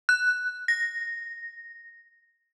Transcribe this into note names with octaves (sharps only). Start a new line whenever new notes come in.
F#6
A#6